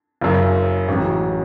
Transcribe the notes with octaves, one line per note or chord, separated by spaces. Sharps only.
F#1 F#2 C#3
A1 G#2 F#3 C#4